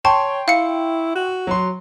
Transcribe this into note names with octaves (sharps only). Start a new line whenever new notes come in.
C#5 G5 A5 C6 C#6
E4 F5 C#7
F#4
F#3 C6